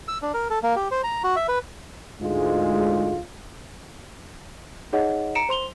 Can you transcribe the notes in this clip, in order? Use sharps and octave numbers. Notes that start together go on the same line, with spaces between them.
E6
D4
A#4
A4
A#3
G4
C5
A#5
F#4
E5
B4
D2 G#2 G#3 F4
D#4 G#4 C#5 D#5 F#5
A#5 C#7 D7 E7
C5 C6 F7 G7